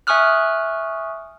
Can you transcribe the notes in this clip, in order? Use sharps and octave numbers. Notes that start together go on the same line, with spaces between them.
E5 G#5 C#6 D#6 F6 F#6